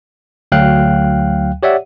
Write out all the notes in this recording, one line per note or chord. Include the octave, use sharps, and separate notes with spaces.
D2 F#3 F5 G5 F#6
G4 C#5 D5 E5 F#5